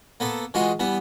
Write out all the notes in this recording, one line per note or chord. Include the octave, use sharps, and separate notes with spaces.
A#3 B3 A4
E3 G#3 F4 F#4 G#4
E3 G3 B3